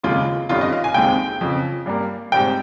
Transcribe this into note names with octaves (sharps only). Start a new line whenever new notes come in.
F1 D#2 C#3 G#3 F4
G1 F2 D#3 G3 C#4 F4
D#5
F5
G#5
F1 D#2 D#3 G#3 C4 G5
F2 C#3 F3
G2 G3 A#3
G#2 G3 C4 G5